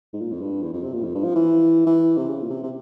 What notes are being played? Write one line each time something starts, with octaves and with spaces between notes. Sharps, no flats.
G#2
A#2
F2
G2
E2
F2
C3
A#2
F2
G2
F3
E3
E3
C3
C#3
A#2
C3
C3